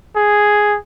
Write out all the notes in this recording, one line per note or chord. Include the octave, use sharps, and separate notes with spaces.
G#4